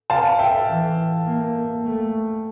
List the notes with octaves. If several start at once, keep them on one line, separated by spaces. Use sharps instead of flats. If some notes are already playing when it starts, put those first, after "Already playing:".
F5 A5
E5 G5
E3
A#3
A3